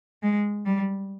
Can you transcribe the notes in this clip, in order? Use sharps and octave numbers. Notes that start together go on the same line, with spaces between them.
G#3
G3